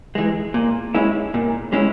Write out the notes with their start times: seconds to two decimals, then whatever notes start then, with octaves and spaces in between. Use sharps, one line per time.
0.15 E3 G#3
0.54 A#2
0.94 G#3 C#4 E4
1.34 A#2
1.73 G#3 C#4 E4